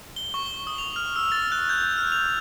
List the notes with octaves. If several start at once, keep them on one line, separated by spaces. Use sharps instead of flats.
G7
C#6
G7
D#6
F7
F6
E6
A6
F#6
G6
F6
F7